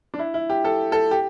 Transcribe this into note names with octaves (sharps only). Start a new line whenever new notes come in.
D4
E4
E4
G4
A4
A4
G4